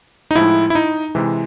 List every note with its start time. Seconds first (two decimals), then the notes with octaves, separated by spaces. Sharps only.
0.31 D#4
0.35 A2 F3 G#3 E4
0.70 E4
0.75 D#4
1.15 C3 E3 G#3